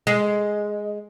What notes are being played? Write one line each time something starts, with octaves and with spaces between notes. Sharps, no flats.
G#3